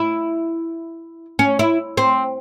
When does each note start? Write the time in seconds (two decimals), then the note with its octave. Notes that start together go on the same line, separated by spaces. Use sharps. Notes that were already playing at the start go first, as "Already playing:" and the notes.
Already playing: E4
1.39 C#4
1.59 E4
1.97 C4